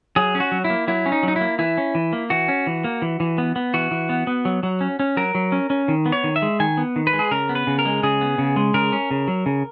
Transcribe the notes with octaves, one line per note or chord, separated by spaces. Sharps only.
F#3 G#4
C#4
F#4
F#3
E4
A#3
F#3 E4
C#4
D#4
F#3 D#4
E4
A#3
E3 E4
C#4
E3
A#3
E3 F#4
C#4
E3
A#3
E3
E3
B3
B3
E3 F#4
E3
B3
B3
F#3
F#3
C#4
C#4
F#3 A#4
F#3
C#4
C#4
D#3
B3
C#5
D#3
E5
G#3
D#3 G#5
B3
D#3
B4
G#3
G#4
C#3 A#4
B3
B4
C#3
A#4
G#3
C#3 G#4
B3
C#3
G#3
C#3 A#4
C#4
C#3
F#3
C#3